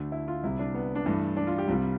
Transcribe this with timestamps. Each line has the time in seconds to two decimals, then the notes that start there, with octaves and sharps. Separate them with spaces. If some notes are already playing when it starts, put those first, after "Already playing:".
Already playing: D2 D3 A3
0.12 E4
0.28 F4
0.43 C2 C3 G3 E4
0.59 D4
0.74 B3
0.95 D4
1.06 G2 E3 A3
1.37 D4
1.47 F4
1.58 G4
1.68 C2 C3 G3 F4